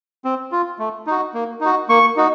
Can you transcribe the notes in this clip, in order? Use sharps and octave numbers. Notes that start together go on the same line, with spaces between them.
C4
F4
A3
D#4 F#4
A#3
D#4 F#4
A#3 C#6
D#4 F#4